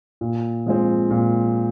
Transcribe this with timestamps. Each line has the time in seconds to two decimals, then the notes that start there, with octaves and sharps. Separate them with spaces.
0.21 A#2
0.66 F3 G#3 C4
1.10 A#2